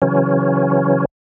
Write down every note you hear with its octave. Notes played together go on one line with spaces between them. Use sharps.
C#3 E3 F#3 C#4